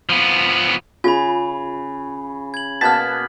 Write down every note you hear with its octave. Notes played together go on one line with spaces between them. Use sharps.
F3 B3
C#3 F4 G#5 B5
G#6 F#7
B2 A#3 B3 A5 F6 G#6 B6